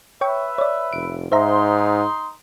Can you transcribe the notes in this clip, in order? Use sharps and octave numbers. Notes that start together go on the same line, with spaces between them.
B4 C#5 E5 G5 C#6
C#5 D5
F1 D7
G#2 D#4 C5 E5 A#5 C6